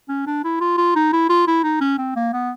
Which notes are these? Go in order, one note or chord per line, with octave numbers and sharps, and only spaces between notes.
C#4
D4
E4
F4
F4
D#4
E4
F4
E4
D#4
C#4
C4
A#3
B3